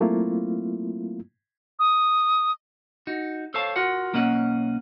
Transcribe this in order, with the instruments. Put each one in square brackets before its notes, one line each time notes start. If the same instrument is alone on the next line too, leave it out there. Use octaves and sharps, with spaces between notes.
[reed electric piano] F#3 A3 A#3 C4 E4 F4
[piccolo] D#6
[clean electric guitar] D#4 F#4
A4 C5 C#5 F5 A5
F4 F#4 A#4 F#5
B1 A#3 C#4 D#5 F#5